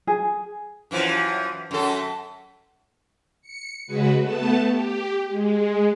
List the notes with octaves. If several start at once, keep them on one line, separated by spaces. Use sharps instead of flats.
G#4
F#2 E3 F3
F#2 A4
C#7
C#3 G#3 F#4 B4
A3 B3 A5
G4
G#3